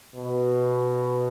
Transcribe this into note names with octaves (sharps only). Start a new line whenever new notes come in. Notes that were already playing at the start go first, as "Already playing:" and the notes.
B2